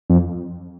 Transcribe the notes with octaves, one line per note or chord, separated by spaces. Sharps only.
F2